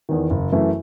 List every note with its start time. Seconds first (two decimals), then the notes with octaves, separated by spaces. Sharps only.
0.09 E2 D#3
0.30 F#1
0.52 F#2 E3 A3